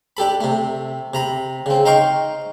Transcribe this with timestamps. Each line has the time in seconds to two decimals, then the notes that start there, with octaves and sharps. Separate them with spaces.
0.17 D4 G4 A4 B5
0.41 C3 A3
1.14 C3 A#5 B5
1.66 C#3 C4
1.85 D#4 D#5 F5 G5 C6 C#6